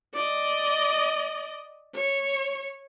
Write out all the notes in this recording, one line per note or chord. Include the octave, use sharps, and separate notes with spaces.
D5 D#5
C#5